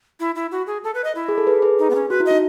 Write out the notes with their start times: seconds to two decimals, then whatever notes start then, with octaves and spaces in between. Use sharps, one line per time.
0.20 E4
0.35 E4
0.51 F#4
0.67 G#4
0.84 A4
0.94 B4
1.04 D#5
1.15 E4
1.29 G#4
1.38 A4
1.47 G#4 B4
1.62 G#4 B4
1.79 D#4
1.90 B3
1.95 C#4
2.10 F#4 B4
2.20 E4
2.26 D#4 D#5